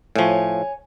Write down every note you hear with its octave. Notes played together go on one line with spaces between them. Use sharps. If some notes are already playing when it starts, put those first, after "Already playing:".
A2 F3 C#5 G#5